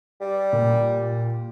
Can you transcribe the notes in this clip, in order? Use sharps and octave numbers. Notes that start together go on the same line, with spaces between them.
G3
A#2